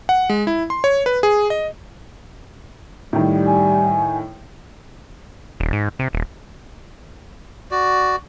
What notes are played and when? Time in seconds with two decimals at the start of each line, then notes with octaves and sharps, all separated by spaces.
0.09 F#5
0.30 G#3
0.47 E4
0.70 C6
0.84 C#5
1.06 B4
1.23 G#4
1.50 D#5
3.13 A2 D#3 G3
3.47 G#5
5.60 D#1
5.73 G#2
5.99 C3
6.13 D#1
7.71 F#4 D5